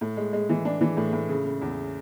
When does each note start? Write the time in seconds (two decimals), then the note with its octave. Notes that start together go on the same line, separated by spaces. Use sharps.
0.01 A2
0.17 G#3
0.33 G#3
0.49 E3
0.65 D4
0.81 E3
0.97 A2
1.13 A2
1.29 C#3
1.45 C#3
1.61 E2